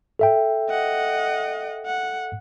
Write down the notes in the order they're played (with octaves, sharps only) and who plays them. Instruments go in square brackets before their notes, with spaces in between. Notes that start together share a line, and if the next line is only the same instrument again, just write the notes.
[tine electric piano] A4 E5 G5
[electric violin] D#5 F#5
F#5